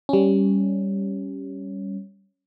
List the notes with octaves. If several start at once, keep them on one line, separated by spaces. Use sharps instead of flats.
G3 C#4